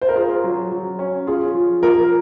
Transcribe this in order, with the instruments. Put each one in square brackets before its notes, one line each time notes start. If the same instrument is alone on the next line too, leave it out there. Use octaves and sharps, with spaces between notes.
[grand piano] C5
A#4
[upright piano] F4 [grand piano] G#4
[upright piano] F#3
F#3
C#4
[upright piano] F4 [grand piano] G#4
[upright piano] F3
[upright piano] F3 [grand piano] A#4